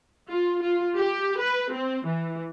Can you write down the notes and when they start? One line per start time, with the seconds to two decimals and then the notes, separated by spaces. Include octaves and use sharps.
0.30 F4
0.63 F4
0.97 G4
1.41 B4
1.73 C4
2.07 E3